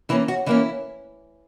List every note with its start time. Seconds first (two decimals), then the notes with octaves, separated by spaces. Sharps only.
0.09 E3 A#3 C#4 E4
0.28 F#4
0.46 E3 A#3 C#4 E4